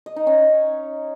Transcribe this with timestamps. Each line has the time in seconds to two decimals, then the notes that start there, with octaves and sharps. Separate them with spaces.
0.06 D#5
0.16 D#4
0.27 C#4